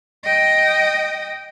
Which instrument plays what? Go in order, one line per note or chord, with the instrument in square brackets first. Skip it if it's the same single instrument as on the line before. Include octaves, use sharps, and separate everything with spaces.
[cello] D#5 G5